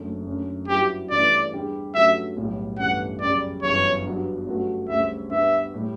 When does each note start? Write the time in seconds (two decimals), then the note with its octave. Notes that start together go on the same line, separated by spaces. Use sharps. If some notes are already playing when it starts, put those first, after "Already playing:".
Already playing: F#1 F#2 D3 A3
0.27 F#2 D3 A3 C#4
0.68 G2 F#3 C#4 E4 G4
1.10 G2 E3 A3 C#4 E4 D5
1.53 E2 D3 G3 D4 G4
1.94 G2 D3 F#3 A3 C#4 E5
2.37 B1 A2 G3
2.79 G1 G2 E3 A3 C#4 F#5
3.21 F#2 C#3 G3 C#4 G4 D5
3.63 G1 F#2 E3 C#5
4.05 G2 F#3 B3 D4
4.47 G2 F#3 A3 C#4 F#4
4.88 D2 C#3 G3 C#4 E5
5.31 G2 D3 G3 B3 E5
5.74 A2 G3